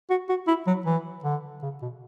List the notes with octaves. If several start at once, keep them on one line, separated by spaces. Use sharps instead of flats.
F#4
F#4
E4
F#3
E3
D3
C#3
B2